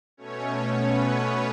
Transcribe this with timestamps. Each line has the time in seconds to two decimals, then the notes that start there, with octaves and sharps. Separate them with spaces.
0.17 B2 A3 C#4 C#5
0.45 C#4 C#5
0.74 B3 B4